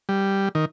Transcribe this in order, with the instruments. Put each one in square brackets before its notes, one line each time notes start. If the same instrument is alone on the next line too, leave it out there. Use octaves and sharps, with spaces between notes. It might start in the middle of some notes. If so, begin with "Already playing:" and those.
[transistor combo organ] G3
D#3